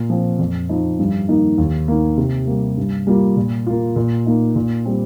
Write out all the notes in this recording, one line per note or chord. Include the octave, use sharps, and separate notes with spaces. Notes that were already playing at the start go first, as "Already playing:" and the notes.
Already playing: A#2
F3 C4
F2
F3 D#4
G2
D#3 A#3 D#4
D#2
D#3 A#3
C3
G3 A#3
G2
G3 A#3 F4
A#2
A#3 F4
A#2
A#3 D#4
A#2
G3 C4